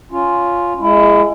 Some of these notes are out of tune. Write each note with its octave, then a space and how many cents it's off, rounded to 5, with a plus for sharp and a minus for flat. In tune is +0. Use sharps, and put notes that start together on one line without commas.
C#4 +15 F4 +0
G#3 +0 E4 +30